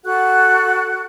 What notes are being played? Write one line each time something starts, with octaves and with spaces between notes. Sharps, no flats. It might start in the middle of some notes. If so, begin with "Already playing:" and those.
F#4 A4 F#5 F#6